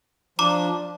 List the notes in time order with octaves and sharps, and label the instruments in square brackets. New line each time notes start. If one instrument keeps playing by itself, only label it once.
[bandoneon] F3 D4 [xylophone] A#5 D6